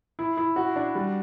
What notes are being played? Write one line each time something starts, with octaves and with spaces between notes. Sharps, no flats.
E4
E4
F#4
D4
G3